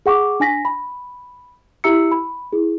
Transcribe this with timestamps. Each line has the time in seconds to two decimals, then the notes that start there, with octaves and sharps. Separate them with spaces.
0.06 G#4 F#5 C#6 D6
0.40 D4 G#5 A#6 B6
0.65 B5
1.84 E4 G4 E5 A#5 E6 C#7
2.12 B5
2.52 E4 G#4